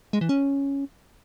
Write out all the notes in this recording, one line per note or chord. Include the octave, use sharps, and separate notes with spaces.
G#3
E3
C#4